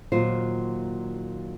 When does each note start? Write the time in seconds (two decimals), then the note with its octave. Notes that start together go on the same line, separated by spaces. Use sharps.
0.12 D#2 A#2 F#3 F4 C5